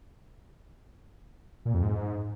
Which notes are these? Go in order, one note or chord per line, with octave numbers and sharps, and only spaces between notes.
A#2
F2
G#2